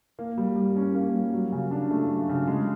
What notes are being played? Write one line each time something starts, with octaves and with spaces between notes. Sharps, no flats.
A#3
G3
G3
C#4
A#3
G3
F#3
C#3
D4
A3
F#3
C#3
G#3